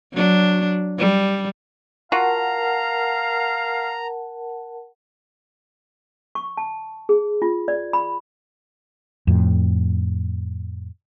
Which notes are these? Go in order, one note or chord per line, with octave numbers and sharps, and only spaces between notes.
F#3 D4
G3
F4 F#4 A#4 F5 F#5 A5 A#5
C#6
A5
G#4
F4
D5
B5
F2 A2